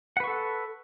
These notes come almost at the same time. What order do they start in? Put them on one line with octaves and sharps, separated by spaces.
F#5 B4 C#6 A4